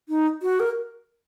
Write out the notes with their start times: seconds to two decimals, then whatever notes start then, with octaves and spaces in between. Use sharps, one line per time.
0.09 D#4
0.42 F#4
0.60 A#4